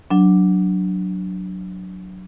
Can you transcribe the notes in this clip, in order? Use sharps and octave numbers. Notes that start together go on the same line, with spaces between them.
F#3 D4